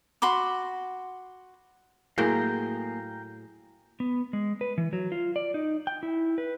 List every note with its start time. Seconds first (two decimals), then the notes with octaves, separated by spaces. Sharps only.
0.22 F#4 B5 C6 D6
2.18 A2 F#3 A#3 G#4 C5 F5 G5 A#5
4.00 B3
4.33 G#3
4.61 B4
4.78 E3
4.93 F#3
5.12 F4
5.36 D5
5.54 D#4
5.87 G5
6.03 E4
6.38 B4